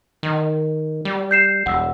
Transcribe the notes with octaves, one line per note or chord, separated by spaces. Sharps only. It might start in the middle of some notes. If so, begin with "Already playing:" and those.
D#3
G3
G6 C7 E7
E1 F#5 E6